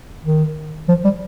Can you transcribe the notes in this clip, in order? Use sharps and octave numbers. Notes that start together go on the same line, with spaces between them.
D#3
F3
G3